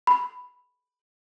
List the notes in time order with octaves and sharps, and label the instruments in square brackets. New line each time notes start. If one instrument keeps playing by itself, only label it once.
[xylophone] B5